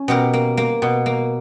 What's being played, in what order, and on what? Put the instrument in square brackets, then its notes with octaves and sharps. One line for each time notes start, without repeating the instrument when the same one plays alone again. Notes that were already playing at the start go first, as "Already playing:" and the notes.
Already playing: [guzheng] C#4
B2 G4 A#4
A#3
A#3
B2
A#3